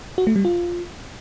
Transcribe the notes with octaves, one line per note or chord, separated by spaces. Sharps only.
F#4
A3
G3
F4